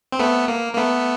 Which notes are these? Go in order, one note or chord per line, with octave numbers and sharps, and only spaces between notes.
C4
A3 B3
A#3
A#3
A3 B3